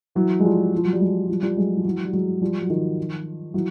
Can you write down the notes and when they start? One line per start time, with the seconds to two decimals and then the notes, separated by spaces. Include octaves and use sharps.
0.15 E3 F#3
0.40 G#3
0.44 F3 G3
0.77 F3
0.85 F#3
0.93 G3
1.01 F#3 G#3
1.28 F3 G3
1.43 F3 G3
1.57 F#3 G#3
1.77 F3
1.85 E3 F#3
2.05 G3
2.13 F#3 G#3
2.41 F3 G3
2.62 F#3
2.70 D#3 F3
3.54 E3 F#3